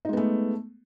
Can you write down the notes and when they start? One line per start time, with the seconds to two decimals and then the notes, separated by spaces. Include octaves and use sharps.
0.05 D#4
0.09 G#3
0.13 B3
0.17 A3